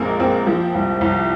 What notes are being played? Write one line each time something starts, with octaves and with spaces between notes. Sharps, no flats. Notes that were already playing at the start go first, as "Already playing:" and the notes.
Already playing: A#1 G#3 A#3 C4
A#1 C4
F3
C2
C2